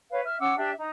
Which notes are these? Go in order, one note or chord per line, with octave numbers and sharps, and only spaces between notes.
B4 C#5 F5
E5 F6
C#4 F#5 D6 E6
D4 G4 E5
D#4